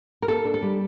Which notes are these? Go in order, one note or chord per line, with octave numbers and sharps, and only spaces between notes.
A#4
A#3 A4
D4
A4
G3